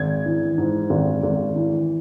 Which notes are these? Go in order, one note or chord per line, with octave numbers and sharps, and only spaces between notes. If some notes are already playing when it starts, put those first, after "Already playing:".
Already playing: G#1 G#6
E3
G#2
G#1
G#1
E3